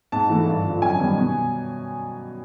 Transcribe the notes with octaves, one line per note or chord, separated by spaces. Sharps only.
G#2 A5
E3 A3
G2
D3 F3
F#2 G#5
D#3 G3 B3
B2